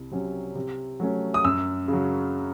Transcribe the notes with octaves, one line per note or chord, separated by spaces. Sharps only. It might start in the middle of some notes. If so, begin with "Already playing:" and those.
Already playing: C2
C3 F#3 C#4
C3
F#3 A3 C#4
D#6
F#2 E6
C#3 F#3